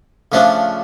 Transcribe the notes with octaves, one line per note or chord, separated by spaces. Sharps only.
C#3 F3 A3 D4